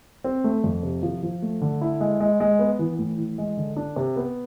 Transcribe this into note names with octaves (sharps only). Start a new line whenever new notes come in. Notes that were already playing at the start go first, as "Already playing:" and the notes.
C4
A3
F2
C3
F3
F3
A3
D3
E4
G#3
G#3
G#3
B3
E3
A2
E3
G#3
D3
D4
C3
B3